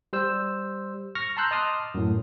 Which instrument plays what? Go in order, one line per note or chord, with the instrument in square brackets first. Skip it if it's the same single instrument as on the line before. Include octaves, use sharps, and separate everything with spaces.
[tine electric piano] G3 C5 E6
C#6 F6 A#6
A5 A#5 C6 E6 F#6 G6
D#5 A5 C6 D6 D#6 F6
F#2 A2